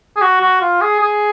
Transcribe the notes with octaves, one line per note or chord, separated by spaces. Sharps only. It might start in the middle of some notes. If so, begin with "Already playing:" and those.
G#4
F#4
F#4
F4
G#4
G#4